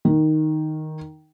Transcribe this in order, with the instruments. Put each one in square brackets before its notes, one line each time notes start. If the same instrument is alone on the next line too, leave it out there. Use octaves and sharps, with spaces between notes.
[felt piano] D#3